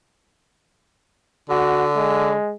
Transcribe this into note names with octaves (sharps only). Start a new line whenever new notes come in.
D3 F#4
G#3